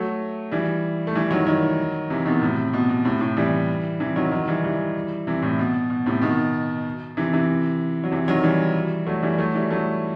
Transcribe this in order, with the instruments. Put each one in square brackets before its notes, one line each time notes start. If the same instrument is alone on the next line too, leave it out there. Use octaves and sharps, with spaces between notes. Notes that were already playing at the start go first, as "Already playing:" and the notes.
Already playing: [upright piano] F#3 A3
E3 G3
A3
E3 G3
D#3 F#3
D#3 F#3
C3 E3
B2 D#3
A2 C3
B2
B2
A2 C3
A2 C3
E3 G3
C3 E3
D#3 F#3
D#3 F#3
E3 G3
E3 G3
C3 E3
A2
B2
B2
A2 C3
B2 D#3
C3 E3
C3 E3
F#3
C3 E3
D#3 F#3
E3 G3
F#3 A3
E3 G3
F#3 A3
E3 G3
F#3 A3